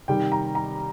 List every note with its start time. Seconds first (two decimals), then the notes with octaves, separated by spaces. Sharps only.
0.08 C3 D#3 G3 G5
0.32 A#5
0.55 A#5